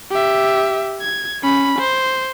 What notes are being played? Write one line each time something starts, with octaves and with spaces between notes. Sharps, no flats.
G4 E5
G#6
C#4 B5
C5